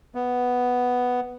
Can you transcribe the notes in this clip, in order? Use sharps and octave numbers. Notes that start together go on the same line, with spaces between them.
B3